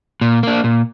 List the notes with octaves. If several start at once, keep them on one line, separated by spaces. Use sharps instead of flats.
A#2
A#3 D4
A#2